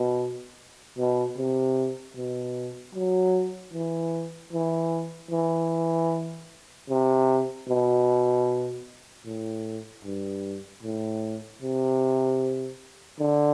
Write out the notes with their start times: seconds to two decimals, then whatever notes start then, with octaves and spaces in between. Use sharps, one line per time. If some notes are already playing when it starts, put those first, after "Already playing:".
Already playing: B2
0.98 B2
1.37 C3
2.16 B2
2.95 F#3
3.73 E3
4.53 E3
5.31 E3
6.89 C3
7.68 B2
9.25 A2
10.04 G2
10.83 A2
11.62 C3
13.19 D3